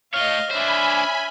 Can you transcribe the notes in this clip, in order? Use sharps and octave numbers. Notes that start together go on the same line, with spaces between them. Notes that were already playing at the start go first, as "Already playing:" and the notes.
A3 C#5 D#5 F5 F6 G7
D4 C5 C#5 E5 G#5 B5